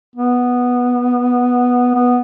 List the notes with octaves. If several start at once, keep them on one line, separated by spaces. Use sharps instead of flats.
B3
B3